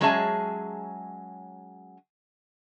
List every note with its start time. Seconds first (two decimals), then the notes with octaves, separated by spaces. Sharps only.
0.01 F#3 G#3 C#4 G#4 E5 A5